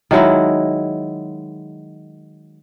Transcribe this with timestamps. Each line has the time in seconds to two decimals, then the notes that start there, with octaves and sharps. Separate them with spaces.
0.11 D#3 F#3 G#3 E4